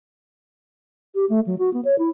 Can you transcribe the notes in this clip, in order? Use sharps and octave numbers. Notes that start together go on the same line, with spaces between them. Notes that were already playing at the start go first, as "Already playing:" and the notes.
G4
A3
F#3
F#4
B3
C#5
E4